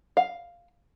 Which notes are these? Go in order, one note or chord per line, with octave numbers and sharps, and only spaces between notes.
F5